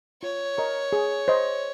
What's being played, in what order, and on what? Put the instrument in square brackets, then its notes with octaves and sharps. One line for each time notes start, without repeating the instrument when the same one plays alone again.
[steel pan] F4 [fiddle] C#5
[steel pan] A#4 D#5 A#5 C#6
G#4
C5 D#5